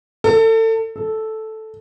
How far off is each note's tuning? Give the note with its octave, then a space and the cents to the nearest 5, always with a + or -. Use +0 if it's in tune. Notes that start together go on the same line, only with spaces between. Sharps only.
A4 +30
A4 -5